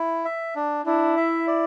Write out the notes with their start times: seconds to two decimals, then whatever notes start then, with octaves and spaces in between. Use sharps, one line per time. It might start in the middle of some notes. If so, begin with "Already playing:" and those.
Already playing: E4
0.25 E5
0.55 D4
0.86 D4 E4
1.17 E5
1.47 D5